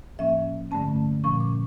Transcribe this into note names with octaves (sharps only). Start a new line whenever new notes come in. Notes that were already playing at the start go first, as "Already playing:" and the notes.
A2 F3 A#3 C#4 E5
G2 D3 A3 C#4 A5
A#2 F3 C#4 C#6
D6